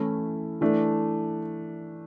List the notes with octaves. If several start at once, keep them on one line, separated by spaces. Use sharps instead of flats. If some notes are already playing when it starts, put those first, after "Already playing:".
Already playing: E3 A3 C#4 E4
E3 A3 D4